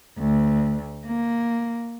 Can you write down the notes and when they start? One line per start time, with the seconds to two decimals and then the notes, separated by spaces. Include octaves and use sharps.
0.18 D2
1.07 A#3